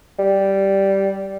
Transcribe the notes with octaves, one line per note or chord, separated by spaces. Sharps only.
G3